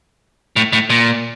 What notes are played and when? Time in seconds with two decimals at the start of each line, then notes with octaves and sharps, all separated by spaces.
0.56 A2
0.73 A2
0.90 A#2